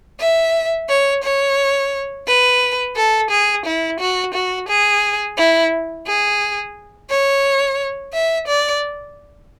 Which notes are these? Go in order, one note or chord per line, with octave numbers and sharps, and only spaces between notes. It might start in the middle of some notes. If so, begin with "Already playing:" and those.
E5
C#5
C#5
B4
A4
G#4
E4
F#4
F#4
G#4
E4
G#4
C#5
E5
D5